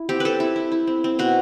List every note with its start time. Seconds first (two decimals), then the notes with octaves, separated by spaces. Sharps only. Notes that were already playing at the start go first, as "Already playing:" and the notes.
Already playing: E4
0.09 C4 G4
0.20 C4 A4 B4
0.40 E4
0.56 E4
0.72 E4
0.87 C4
1.04 C4
1.19 B2 F#4